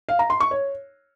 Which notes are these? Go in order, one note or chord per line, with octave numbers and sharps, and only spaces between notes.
F5
A#5
C6
C#6
C#5